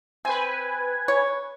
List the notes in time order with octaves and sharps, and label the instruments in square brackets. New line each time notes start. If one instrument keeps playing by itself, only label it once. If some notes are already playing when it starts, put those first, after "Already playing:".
[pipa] C4 [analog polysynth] B4 G#5
[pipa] C#5